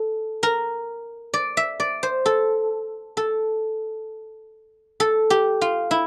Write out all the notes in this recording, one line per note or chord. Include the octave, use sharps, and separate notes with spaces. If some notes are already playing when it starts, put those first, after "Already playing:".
Already playing: A4
A#4
D5
E5
D5
C5
A4
A4
A4
G4
F4
E4